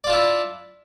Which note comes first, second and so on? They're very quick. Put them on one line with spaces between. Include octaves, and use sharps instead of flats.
D5 F4 D4 E4